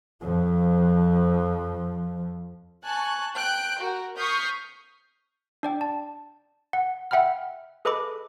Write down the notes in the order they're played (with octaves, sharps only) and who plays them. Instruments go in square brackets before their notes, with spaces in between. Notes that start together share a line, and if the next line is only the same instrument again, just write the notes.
[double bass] F2 F3
[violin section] G#5 A5 C#6 F#6
G5 F#6 G6 D7
F#4 A#4
C#6 D#6 F6 G6 B6 C7
[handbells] D4 D5 G5
A5
F#5
E5 F#5 G5 B5 F6
G#4 A4 B4 D#5 B5 D6